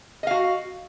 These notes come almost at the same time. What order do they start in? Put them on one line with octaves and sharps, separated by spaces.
D#5 F5 F#4